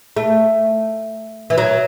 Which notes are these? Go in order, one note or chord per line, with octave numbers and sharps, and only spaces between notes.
A3
E3
F#3